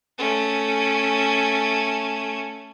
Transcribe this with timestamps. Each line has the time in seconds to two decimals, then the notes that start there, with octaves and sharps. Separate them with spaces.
0.18 A3 C#4